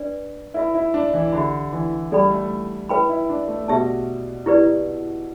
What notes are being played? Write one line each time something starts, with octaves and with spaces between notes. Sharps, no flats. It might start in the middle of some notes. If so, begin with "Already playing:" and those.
Already playing: D4 B4 D5
E4 B4 E5 B5
E4
D4
E3
D3 G4 E5 B5
E3
G3 A4 D5 G5 B5
A3
E4 B4 G5 B5
E4
D4
A3
B2 G4 E5 A5
E4 G4 B4 D5